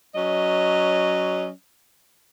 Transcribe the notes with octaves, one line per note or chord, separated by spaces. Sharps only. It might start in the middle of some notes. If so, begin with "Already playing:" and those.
F#3 C#4 D#5